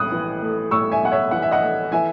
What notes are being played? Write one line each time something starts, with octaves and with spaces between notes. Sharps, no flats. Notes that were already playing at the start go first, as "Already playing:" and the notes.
Already playing: B1 A2 D#6 F#6
E3
A3
A2 C#6 E6
E5 G#5
B1 F#5
C#5 E5
E3 F#5
E5
D#5 F#5
A3
E3 E5 G#5